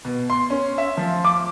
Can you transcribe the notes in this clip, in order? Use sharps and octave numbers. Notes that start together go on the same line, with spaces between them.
B2
C6
C#4
E5
F3
D6